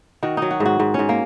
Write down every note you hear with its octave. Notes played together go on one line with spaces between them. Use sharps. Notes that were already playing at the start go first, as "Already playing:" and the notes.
D#3 F#4
F#3 D#4
F#4
G#2
F#4
G#2
G#2 C#4
A#3